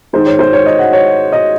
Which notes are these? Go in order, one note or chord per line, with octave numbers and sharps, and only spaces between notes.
G#2 D#3 G#3 C5
C#5
C5
C#5
D#5
F#5
C#5
D#5